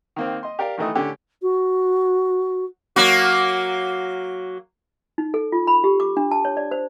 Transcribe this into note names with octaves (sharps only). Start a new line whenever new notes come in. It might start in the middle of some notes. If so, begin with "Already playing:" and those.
D#3 A#3 C4
D#5 C6
G4 A#4 D5 F5
A1 D#3 E3 A3 D#5 D#6
A2 D3 C#4 G4
F#4
F#3 A#3 F#4
D#4
A4
F4
B5
G4
D6
D4
A5
C#5
D5
C5